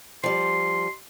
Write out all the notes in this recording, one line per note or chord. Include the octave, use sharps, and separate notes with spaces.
F3 G3 C6